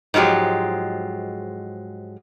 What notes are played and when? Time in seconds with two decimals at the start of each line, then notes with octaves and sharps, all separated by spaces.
0.14 G#2 F3 F#3 G#3 G4